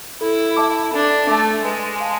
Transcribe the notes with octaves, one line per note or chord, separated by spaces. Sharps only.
E4 A4
E5 A5 D6
D4 A4
A3 E5 A5 D6
G#3 B4
F5 A5